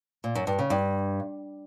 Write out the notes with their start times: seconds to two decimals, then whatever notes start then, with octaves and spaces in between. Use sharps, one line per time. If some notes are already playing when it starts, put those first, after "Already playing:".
0.24 A#2
0.35 F#2
0.47 G2
0.59 C#3
0.70 G2